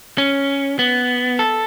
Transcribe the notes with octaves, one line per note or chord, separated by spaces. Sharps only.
C#4
B3
A4